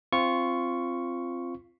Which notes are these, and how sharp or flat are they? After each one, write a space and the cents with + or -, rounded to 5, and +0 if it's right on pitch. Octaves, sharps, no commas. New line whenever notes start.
C4 +0 F4 -15 C#6 +0